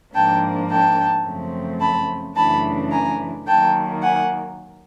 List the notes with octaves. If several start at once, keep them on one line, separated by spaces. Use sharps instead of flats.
G#2 F3 A#3 D4 G5 A5
G5 A5
F#2 C#3 F3 A3 C4
A5 B5
F#2 C#3 E3 A3 D4 A5 B5
G#5 A#5
D#3 F#3 A#3 G5 A5
F#5 G#5